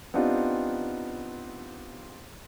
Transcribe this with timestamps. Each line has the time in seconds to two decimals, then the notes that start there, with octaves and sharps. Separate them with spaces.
0.14 B3 C4 D4 D#4 F4 G4